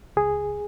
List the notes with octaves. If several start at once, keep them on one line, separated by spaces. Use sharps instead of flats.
C#2 G#4